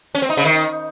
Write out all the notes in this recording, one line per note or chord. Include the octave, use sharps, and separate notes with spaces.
C#4
C4
D#4
C#3
D#3